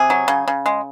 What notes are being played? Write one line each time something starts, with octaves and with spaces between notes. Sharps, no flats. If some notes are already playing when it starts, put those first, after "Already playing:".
Already playing: C3 G#4
F#3
C#3
C#3
G#3